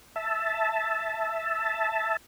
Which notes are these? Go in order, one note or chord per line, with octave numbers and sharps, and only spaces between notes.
E5 A5